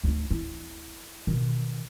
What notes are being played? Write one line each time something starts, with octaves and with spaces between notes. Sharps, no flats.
D2 D#4
E4
B2 D#3